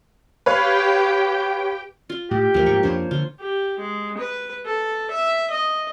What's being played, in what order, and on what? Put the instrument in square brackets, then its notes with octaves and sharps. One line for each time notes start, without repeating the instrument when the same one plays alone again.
[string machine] G4 G5 [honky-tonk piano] B4 C#5 F5
[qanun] F4
[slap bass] A2 [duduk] G4
[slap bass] D#2 E3 A3 [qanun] F3 A#3
[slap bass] G#2 [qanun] C#6
[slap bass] F2 D4 [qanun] C5 C#5
[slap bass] D3 [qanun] F4
[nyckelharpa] G4
G#3
B4
A4
E5
D#5